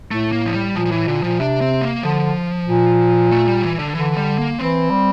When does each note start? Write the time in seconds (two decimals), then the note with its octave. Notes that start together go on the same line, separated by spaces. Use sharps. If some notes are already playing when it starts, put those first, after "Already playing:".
0.11 A2 A3
0.32 A#3
0.46 F3
0.54 G3
0.75 A#2 F3
0.86 F3
0.91 A2 E3
1.08 A#2 D3
1.23 A#2 F3
1.39 C3 D4
1.61 C4
1.81 A#3
2.03 D3 F3
2.67 A#2
3.31 A3
3.48 G3
3.62 E3
3.79 D3
3.95 D3 E3
4.17 G3
4.38 A#3
4.59 E3 C4
4.90 G3